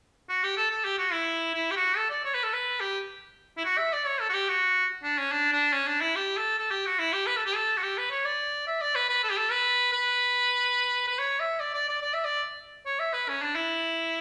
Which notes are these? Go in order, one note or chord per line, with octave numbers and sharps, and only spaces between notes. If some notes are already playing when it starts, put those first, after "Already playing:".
F#4
G4
A4
A4
G4
F#4
E4
E4
G4
F#4
A4
D5
C#5
B4
A4
B4
G4
E4
F#4
E5
D5
C#5
A4
F#4
G4
F#4
D4
C#4
D4
D4
C#4
D4
E4
G4
A4
A4
G4
F#4
E4
G4
B4
A4
G4
A4
F#4
G4
B4
C#5
D5
E5
D5
B4
B4
A4
G4
A4
B4
B4
B4
C#5
E5
D5
D5
D5
D5
E5
D5
C#5
E5
B4
C#4
D4
E4